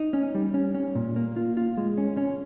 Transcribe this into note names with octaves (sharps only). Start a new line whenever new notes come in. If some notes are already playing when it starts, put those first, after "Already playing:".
Already playing: D#4
C#4
G3
C#4
C#4
A#2
A#3
F4
F4
G#3
C#4
C#4